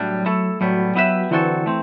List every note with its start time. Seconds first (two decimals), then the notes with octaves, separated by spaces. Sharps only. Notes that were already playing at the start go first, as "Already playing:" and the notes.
Already playing: A2 F#3 G3 D4
0.26 A3 E4 A4
0.61 A2 F#3 G3 B3
0.95 B3 E4 G4 B4 E5
1.31 D3 E3 F#3 C4 F#4 A4
1.66 A3 C4